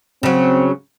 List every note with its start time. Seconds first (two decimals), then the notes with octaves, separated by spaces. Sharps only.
0.23 C#3 F#3 C4